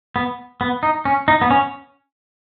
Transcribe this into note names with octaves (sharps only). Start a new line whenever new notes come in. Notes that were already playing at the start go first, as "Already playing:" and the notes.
B3
B3
D#4
C#4
D#4
B3
C#4